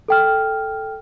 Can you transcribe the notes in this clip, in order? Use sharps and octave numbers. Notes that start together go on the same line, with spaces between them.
A4 G5 F6